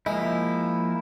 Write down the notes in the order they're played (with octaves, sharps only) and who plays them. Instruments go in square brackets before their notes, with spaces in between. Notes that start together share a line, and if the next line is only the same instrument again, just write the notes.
[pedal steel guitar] F3 A#3 E4 [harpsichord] G#3